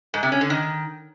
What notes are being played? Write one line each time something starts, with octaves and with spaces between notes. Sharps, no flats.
G#2
C3
C#4
D3
D#3